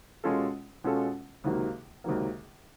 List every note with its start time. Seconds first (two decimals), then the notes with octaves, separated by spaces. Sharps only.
0.24 B2 G#3 C#4 F4 A4
0.84 B2 G#3 C#4 F4 A4
1.44 C#2 C3 D#3 F#3 A#3
2.04 C#2 C3 D#3 F#3 A#3